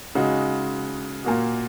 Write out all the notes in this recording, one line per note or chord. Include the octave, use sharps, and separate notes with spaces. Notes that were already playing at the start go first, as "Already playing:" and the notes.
C#3 G#3 D#4 F#4
A#2 A#3 F#4